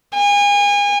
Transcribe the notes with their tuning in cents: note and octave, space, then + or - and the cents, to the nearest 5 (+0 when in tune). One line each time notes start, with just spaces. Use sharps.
G#5 -35